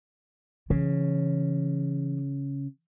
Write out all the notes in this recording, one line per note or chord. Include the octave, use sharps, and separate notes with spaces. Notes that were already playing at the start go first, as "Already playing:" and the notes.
C#3 E3